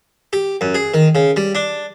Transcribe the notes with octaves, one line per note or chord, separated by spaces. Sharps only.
G4
F#2
G#4
D#3
C#3
G3
D4